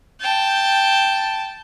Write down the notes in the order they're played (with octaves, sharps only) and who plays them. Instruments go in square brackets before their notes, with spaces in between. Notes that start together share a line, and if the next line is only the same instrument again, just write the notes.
[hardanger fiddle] G5 A5